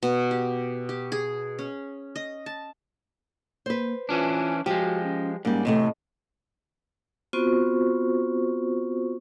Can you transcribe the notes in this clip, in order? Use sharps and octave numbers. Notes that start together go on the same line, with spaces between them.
B2
G4
G4
G#4
C#4
D#5
A5
A#3 B4 C5
E3 C#4 D4 F4
F3 G#3 F#4 G4
C#4
G#2 G3 A#3 C#4
E2 A2 C3 A3 D#5
B3 C4 F4 F#4 C5 C#6